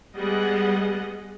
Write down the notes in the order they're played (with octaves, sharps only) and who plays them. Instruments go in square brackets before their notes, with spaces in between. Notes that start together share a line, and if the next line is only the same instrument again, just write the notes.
[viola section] G3 G#3 B3 G#4 D#5 F#5